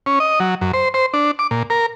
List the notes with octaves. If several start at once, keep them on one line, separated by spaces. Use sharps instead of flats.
C#4
D#5
F#3
F#2
C5
C5
D4
D6
A#2
A#4